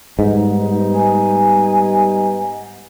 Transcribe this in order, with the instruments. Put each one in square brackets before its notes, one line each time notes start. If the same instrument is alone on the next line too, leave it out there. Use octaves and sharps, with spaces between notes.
[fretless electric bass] G#2 [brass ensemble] G3 B3 D#4
[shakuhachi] G#5